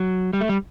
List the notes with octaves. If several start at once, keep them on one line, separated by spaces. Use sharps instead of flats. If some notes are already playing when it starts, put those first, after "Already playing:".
Already playing: F#3
G3
A3
G3